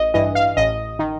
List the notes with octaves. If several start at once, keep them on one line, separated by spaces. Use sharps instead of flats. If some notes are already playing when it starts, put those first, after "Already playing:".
Already playing: A1 D#5
G2 E3 D#5
F5
A1 D#5
D#3